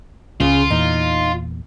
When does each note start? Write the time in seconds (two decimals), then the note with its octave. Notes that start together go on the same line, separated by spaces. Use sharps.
0.40 C#2 C#3 F4 G#4
0.70 E2 A#2 D#4